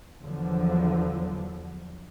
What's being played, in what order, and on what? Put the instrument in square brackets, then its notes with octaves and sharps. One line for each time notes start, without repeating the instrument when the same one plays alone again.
[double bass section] E2 D3 F3 F#3